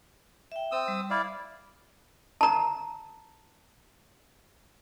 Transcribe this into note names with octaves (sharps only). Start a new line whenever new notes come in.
E5 G5
C4 D#6 E6
G3
E4 D5 F5
A5 A#5